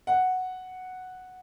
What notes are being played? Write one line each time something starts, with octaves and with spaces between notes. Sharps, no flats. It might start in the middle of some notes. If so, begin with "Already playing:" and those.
F#5